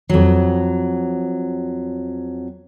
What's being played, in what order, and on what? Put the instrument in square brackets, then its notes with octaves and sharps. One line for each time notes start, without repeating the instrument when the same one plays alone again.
[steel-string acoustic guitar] F2 F#3